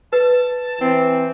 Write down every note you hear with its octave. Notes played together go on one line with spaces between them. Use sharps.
B4 A5
E3 C4